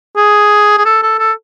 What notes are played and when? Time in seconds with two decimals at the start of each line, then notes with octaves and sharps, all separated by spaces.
0.16 G#4
0.78 G#4
0.85 A4
1.03 A4
1.19 A4